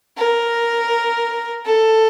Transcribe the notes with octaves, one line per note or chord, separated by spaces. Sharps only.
A#4
A4